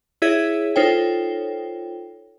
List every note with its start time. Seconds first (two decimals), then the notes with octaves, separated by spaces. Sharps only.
0.22 E4 G#4 C#5 E5 G#6
0.76 D#4 F4 A4 C5 C#5 G5